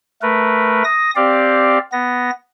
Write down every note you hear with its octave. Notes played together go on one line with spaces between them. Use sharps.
A3 A#4 B4
D#6 A#6
C4 G4 D5 F5
B3 A#6